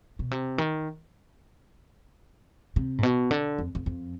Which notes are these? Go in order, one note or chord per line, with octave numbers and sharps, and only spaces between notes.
B2
C3
D#3
C3
G#2
B2
D3
F2
F2
F2